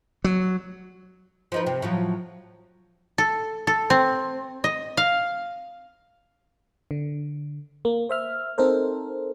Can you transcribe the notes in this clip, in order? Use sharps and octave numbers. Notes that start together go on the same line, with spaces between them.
F#3
F3 D#4 B4
C3
A2 F3 F#3
A4
A4
C4
D#5
F5
D3
A#3
C5 E5 F6
C4 D#4 A4 A#4 C5